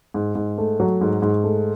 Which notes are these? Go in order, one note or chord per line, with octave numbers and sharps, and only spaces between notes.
G#2
G#2
A3
F#3
G#2
G#2
A3